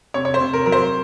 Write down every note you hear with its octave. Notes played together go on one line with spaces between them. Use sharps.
C3 C#5
C#5
C5
C3
A#4
F#3 A#4
C5